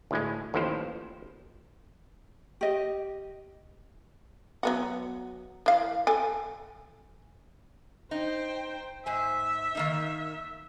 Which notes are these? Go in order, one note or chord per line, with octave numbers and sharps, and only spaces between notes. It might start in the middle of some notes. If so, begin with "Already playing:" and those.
D2 A2 G#3
A1 D#2 A2 F3 C5
G4 D#5
F#3 B3 F#4
E3 F5
A4 G#5
D#4 C5 G5
G#2 C5 E5 G#5
D#3 A#3 D#4